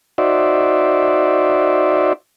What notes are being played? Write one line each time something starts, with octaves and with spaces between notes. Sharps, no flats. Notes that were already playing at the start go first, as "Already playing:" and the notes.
D#4 F#4 C5 D5 E5